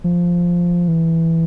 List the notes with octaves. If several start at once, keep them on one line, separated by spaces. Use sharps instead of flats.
F3
E3